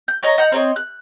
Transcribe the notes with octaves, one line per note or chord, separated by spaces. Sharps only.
G6
C#5 D#5 A#5 C#6
D#5 F#5 A#5 G6
C4 C#5 D#5
F#6